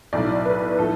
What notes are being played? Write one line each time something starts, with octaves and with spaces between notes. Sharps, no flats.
B1 A2 F#3 D5
B4
A2 F3 A4